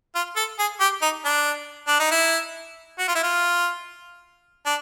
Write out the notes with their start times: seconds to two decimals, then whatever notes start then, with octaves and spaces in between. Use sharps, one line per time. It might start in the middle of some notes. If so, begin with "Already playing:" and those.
0.15 F4
0.36 A4
0.59 G#4
0.80 G4
1.02 D#4
1.24 D4
1.87 D4
2.00 D#4
2.11 E4
2.98 F#4
3.08 F4
3.15 E4
3.23 F4
4.65 D4